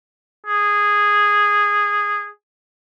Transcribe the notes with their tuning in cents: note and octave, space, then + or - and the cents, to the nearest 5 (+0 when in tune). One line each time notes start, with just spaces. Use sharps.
G#4 -10